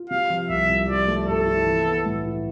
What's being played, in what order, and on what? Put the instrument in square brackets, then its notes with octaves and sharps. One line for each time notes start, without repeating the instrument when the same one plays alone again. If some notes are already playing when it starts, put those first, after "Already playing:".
Already playing: [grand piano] F4
[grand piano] C3 [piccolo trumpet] F5
[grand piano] F3
[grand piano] C2 [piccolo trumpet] E5
[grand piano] C2
[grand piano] F3 [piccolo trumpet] D5
[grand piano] A3
[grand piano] G2 [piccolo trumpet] A4
[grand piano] E4
E3
B3
A2
E4